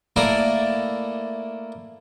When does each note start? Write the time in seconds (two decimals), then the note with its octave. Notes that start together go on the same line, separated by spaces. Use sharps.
0.16 A3 A#3 E4 A4 A#4 D5